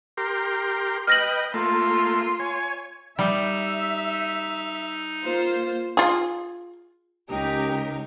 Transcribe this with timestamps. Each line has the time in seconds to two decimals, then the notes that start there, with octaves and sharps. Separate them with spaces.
0.17 G4 A#4 C6
1.07 B4 D#5 G5 F6 A#6 F#7
1.54 A3 A#3 F4
2.40 C#5 G#5
3.19 G3 D#4 E5
5.24 A#3 F4 C5
5.97 F4 G#4
7.29 C#2 D#4 G4 A#4